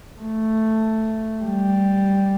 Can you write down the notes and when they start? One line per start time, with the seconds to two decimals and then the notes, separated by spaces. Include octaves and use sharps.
0.20 A3
1.43 G3